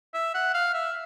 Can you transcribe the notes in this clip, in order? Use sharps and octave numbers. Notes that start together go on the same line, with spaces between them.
E5
F#5
F5
E5